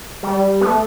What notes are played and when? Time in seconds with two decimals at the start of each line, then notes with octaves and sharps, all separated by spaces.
0.23 G3
0.61 B3
0.66 A3